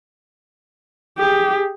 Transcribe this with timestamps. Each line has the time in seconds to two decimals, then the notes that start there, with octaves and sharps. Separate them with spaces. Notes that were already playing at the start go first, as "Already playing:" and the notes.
1.18 G4 G#4